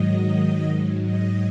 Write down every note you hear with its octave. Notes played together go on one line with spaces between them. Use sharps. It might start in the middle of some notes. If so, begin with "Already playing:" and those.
Already playing: G#2 D#3 F#3 D#5
G#2 F#3
D#5